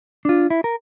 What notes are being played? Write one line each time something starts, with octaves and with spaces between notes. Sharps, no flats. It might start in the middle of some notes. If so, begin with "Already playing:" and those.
D4 F4
E4
A#4